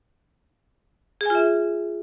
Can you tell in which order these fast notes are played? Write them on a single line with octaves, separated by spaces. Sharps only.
G#4 G#5 F4 E5